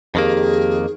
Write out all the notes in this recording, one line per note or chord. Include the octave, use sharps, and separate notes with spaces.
F2 D#3 A#3 G4 G#4